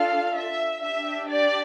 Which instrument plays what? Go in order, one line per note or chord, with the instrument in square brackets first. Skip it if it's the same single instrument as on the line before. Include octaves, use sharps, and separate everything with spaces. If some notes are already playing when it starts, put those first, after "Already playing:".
Already playing: [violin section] D4 F4 A4 F5
E5
D4 G4 E5
D5